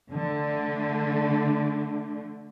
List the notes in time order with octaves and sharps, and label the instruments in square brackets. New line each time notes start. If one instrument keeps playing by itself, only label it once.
[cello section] D3 A3